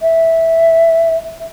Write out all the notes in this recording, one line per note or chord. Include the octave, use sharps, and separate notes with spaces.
E5